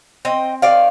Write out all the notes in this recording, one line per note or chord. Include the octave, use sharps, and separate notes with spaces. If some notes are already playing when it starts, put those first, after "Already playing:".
C4 D#5 G5
D#3 D5 F5